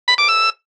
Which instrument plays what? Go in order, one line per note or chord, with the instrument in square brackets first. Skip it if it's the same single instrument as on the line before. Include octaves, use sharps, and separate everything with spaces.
[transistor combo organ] B5
D6
E6